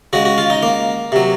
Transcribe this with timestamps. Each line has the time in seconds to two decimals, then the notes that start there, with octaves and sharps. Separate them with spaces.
0.13 C#3 G#3 F#4
0.25 F#4
0.38 F4
0.50 D#4
0.63 A#3
1.12 C3 F#3